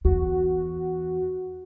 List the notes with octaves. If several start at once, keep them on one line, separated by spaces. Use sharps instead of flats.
E2 F#4